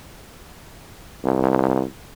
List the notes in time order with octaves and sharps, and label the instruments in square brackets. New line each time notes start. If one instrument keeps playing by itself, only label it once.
[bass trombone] C2